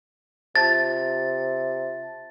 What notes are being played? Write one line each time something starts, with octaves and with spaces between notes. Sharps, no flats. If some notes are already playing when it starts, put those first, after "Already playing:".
C3 F4 A5 A6